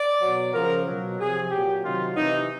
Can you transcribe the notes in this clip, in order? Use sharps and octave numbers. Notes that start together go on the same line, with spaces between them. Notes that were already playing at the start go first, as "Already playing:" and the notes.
Already playing: D5
B2 F#3
C#3 F3 A#4
B2 F#3
C3 F3 G#4
A#2 F#3 G4
C3 D#3 F#3 F4
C3 E3 D#4